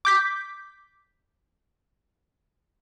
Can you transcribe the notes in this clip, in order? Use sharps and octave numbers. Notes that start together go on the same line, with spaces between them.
D6 G6 B6